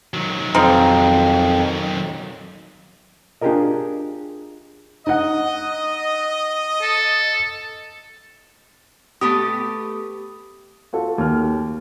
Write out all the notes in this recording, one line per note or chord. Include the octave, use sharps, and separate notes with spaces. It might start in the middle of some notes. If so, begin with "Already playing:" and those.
D#3 F#3
F2 C4 D#4 F4
D4 F4 G4 G#4 A#4 D#5
D#4 D#5 F#5
A4
A3 B3 G4 D#6
F4 F#4 A4
D#2 F6